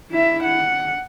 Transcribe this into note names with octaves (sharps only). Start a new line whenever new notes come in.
E4 E5
F#5